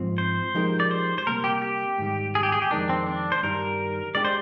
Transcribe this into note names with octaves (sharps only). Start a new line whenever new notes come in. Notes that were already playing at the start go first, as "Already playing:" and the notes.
Already playing: G#2 F3 C4
C5
F3 G#3 D#4 G4 A#4
D5
C5
C5
C3 G3 A#3 A#4
G4
G4
G#2 D#3 G3
G#4
G4
G#4
G4
F2 D#3 G#3 D4 D#4 A#4
C4
D4
C5
G2 D#3 G3 A#4
G#3 D4 G4 D5
C5